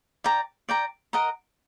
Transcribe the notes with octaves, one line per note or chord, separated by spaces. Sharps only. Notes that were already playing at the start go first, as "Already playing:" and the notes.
D5 G5 A#5
D5 G5 A#5
A#4 D#5 F#5 A#5